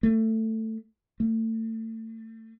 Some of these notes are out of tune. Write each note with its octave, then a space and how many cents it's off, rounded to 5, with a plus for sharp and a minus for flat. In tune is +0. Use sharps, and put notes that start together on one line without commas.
A3 +15
A3 +30